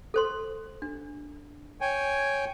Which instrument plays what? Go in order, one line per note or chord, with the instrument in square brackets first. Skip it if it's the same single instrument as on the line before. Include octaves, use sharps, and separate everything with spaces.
[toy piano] A4 C5 C6
D4
[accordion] C#5 G5 G#5